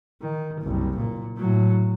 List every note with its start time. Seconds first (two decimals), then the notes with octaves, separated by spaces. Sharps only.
0.21 D#3
0.62 F#1 C2
0.97 A#2
1.37 A2 F#3